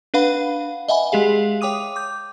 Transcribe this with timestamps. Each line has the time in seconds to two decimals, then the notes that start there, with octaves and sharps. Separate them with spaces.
0.14 D4 B4 F5 F#5 B5
0.88 D#5 E5 F#5 G#5 B5
1.12 G#3 G4 G#4 F5
1.61 C#5 G5 D6 D#6 D#7
1.96 D6 G6